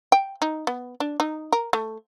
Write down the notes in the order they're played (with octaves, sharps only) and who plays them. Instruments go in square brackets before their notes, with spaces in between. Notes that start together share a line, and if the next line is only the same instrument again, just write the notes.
[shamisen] G5
D#4
B3
D4
D#4
A#4
A3